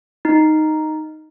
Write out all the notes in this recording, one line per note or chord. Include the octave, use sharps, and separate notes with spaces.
D#4